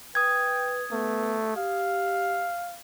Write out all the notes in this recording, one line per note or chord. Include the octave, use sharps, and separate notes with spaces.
B4 G5 D#6 G#6
A3 B3
G4 F5